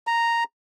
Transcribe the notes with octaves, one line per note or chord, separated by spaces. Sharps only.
A#5